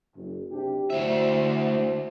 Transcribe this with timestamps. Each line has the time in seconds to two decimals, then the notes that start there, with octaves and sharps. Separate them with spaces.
0.16 F#1
0.51 C3 D4 G4
0.90 D2 E4 F#4 C5 E5